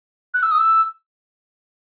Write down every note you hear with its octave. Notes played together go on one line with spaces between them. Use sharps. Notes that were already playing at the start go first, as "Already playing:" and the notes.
F#6
E6
D#6
E6